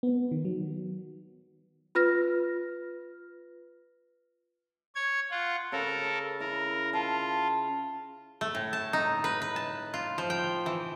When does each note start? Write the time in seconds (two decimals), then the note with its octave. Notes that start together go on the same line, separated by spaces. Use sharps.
0.03 B3
0.31 D#3
0.45 F#3
1.95 F4 B4 F6 A#6
4.95 C#5 G#6
5.31 F4 F#5
5.72 C#3 A4 A#4
6.40 E4 A#4
6.93 F4 A5
8.41 A3
8.55 A2
8.73 A5
8.93 D#4
9.24 B4
9.42 B4
9.56 A5
9.94 F4
10.18 F3
10.30 G5
10.66 E3